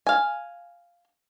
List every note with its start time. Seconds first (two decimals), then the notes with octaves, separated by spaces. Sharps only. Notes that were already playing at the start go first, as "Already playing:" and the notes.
0.07 F5 G#5